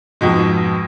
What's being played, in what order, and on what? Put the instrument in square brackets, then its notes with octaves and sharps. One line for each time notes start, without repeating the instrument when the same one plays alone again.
[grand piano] F2 G#2 B2 G#3